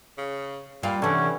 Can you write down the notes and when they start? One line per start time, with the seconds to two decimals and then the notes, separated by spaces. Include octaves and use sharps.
0.18 C#3
0.83 A#2 G3 F5
1.02 C3 E3 G3 C#4 D4 A4 F#5